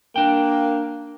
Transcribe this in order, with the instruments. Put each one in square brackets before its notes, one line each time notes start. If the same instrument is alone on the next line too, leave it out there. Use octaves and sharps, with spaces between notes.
[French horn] A#3 [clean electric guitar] D4 G5